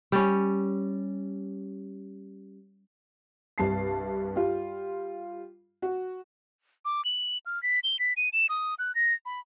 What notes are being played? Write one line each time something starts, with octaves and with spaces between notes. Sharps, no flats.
G3 C#4
C2 G2 A5 C7
G3 F4
F#4
D6
F#7
F6
B6
G7
B6
D#7
E7
D#6
F#6
A#6
B5